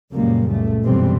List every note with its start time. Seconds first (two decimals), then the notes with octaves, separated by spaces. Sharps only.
0.11 C#2 F#2 A#2 C#3 G3 A#3
0.48 C#2 A#2 A3
0.82 C#2 F#2 B2 E3 G3 C4